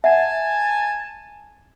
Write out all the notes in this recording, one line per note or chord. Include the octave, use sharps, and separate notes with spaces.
E5 F#5 G#5 A5